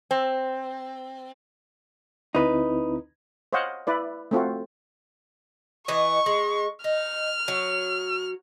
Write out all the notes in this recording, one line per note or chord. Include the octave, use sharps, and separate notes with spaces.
C4
D2 C4 D#4 E4 B4
C5 C#5 D#5 F5 F#5
E4 B4 D5
A3 C4 F4 F#4
E3 D#5 C#6
G#3
D#4 F6
F#3